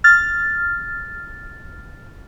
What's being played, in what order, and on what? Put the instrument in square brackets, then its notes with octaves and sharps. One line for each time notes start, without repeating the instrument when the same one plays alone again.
[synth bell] F6 A6